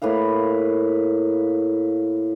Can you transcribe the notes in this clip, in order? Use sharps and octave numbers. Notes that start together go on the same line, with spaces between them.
A2 A#3 B4 F5